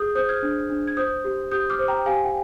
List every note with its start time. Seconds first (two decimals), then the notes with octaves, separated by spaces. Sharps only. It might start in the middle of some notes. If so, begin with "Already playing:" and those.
Already playing: G#4 D#6 G6
0.15 C5 D#6 G6
0.29 F6 G#6
0.43 D4
0.70 D4
0.87 G#6
0.97 C5 D#6 G6
1.24 G4
1.51 G4 D#6 G6
1.70 D6 F6
1.79 C5
1.88 G5 A#5
2.06 G4 F5 G#5
2.24 G5